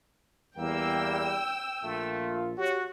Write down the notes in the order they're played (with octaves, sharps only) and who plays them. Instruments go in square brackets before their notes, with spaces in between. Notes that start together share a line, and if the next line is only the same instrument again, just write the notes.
[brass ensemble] E2 G3 [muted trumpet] A#3 [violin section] G5 E6
[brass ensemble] A#1 A#3 F4 [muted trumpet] A3
[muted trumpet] F#4 [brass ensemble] G4 C#5